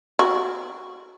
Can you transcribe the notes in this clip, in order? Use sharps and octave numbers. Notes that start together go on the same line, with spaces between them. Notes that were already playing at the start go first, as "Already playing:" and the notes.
F#4